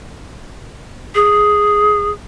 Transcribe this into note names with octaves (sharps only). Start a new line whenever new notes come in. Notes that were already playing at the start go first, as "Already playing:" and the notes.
G#4